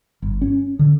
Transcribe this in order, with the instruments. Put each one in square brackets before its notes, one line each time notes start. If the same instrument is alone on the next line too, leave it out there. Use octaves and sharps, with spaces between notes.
[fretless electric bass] G1
C#4
D3